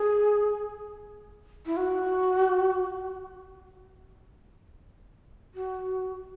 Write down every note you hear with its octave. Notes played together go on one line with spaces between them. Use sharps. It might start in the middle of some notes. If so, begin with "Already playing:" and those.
Already playing: G#4
E4
F#4
F#4